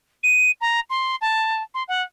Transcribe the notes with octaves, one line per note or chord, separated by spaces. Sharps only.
D#7
A#5
C6
A5
C6
F#5